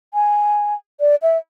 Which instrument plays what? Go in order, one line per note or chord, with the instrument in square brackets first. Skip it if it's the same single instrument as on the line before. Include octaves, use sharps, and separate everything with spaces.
[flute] G#5
D5
E5